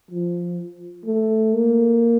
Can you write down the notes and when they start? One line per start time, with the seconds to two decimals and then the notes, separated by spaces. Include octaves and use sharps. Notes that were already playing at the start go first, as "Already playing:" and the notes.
0.11 F3
1.05 A3
1.54 A#3